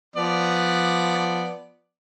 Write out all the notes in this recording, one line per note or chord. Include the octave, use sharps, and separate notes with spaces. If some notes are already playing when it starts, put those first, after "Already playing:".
F3 B3 D5